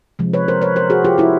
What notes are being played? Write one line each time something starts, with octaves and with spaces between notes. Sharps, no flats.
C3 F3 G#3
B4 C#5
A#4 C5
B4 C#5
A#4 C5
F#4 G#4
F4 G4
E4 F#4